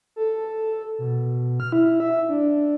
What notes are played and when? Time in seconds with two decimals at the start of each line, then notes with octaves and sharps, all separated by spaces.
0.16 A4
0.99 B2
1.60 F6
1.72 E4
2.00 E5
2.29 D4